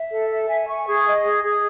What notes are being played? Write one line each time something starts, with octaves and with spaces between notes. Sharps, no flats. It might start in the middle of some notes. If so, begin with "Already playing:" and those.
Already playing: E5
A4
E5
G#5
C#6
G#4
D#5
G#4
G#4